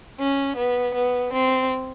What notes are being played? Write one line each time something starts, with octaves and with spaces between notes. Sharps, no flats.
C#4
B3
B3
C4